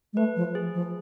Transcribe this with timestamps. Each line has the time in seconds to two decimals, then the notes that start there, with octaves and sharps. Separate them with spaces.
0.13 G#3
0.17 A3 B4
0.36 F3
0.55 G#4
0.75 F3